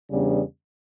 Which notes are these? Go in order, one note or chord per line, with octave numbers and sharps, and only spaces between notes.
E2 C#3 G3 B3 D4